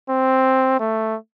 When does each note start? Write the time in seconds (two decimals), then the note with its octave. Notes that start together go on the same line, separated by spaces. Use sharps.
0.10 C4
0.80 A3